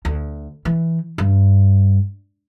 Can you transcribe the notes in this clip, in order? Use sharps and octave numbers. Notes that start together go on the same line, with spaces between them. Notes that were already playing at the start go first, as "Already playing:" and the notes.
D2
E3
G2